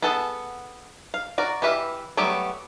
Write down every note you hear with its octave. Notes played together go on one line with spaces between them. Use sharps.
B3 G#4 A4 F#5 A5
F5
F#4 A#4 D5
E3 G4 B4 E5 F5
F#3 G3 A3 B3 G4